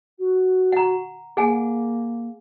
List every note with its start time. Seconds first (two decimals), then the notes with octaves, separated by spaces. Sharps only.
0.19 F#4
0.72 F#5 A#5
1.37 A#3 G#4 F#5 G#5